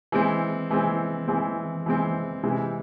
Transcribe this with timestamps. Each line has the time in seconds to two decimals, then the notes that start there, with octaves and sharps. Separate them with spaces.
0.12 E3 G#3 C4
0.71 E3 G#3 C4
1.28 E3 G#3 C4
1.86 E3 G#3 C4
2.43 C3 E3 G#3